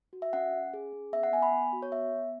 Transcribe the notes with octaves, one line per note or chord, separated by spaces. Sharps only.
F#4
E5
C#4 F#5
C#4
G#4
C#4
B3 E5
F#5
B3 G#5
B5
B3
F#4
C#5
B3 E5
B3